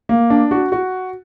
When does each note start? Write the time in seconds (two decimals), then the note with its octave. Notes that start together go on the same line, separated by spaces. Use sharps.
0.09 A#3
0.30 D4
0.51 F#4
0.72 F#4